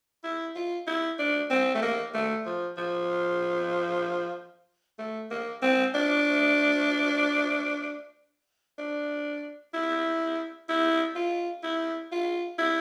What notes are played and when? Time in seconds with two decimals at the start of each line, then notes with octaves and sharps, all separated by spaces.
0.24 E4
0.56 F4
0.87 E4
1.19 D4
1.50 C4
1.75 A3
1.82 A#3
2.14 A3
2.45 F3
2.77 F3
4.99 A3
5.30 A#3
5.62 C4
5.94 D4
8.79 D4
9.74 E4
10.69 E4
11.16 F4
11.63 E4
12.12 F4
12.59 E4